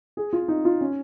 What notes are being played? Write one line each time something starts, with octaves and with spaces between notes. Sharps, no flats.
G#4
F4
D#4
F4
C#4